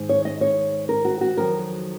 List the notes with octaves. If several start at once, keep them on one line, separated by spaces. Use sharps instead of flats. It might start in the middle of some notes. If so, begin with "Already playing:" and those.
Already playing: G#2 D#3
C#5
D#5
C#5
A#4
F#4
F#4
F2 D#3 F#3 A#4